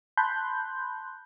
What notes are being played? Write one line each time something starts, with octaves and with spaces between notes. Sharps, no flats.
A5 B5 C6 F#6 G6